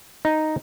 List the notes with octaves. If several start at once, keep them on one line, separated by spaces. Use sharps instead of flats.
D#4